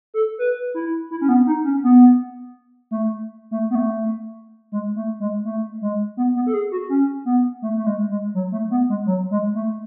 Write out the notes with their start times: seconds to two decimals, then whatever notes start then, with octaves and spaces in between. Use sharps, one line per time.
0.14 A4
0.38 B4
0.74 E4
1.11 E4
1.21 C#4
1.29 B3
1.47 D#4
1.64 C#4
1.83 B3
2.91 A3
3.51 A3
3.70 B3
3.75 A3
4.72 G#3
4.96 A3
5.20 G#3
5.45 A3
5.82 G#3
6.17 B3
6.35 B3
6.47 A4
6.54 G#4
6.71 F#4
6.89 C#4
7.25 B3
7.62 A3
7.77 A3
7.87 G#3
8.10 G#3
8.34 F#3
8.52 A3
8.71 B3
8.89 G#3
9.06 F#3
9.31 G#3
9.55 A3